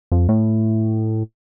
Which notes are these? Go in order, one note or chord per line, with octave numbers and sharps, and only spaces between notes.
F2
A2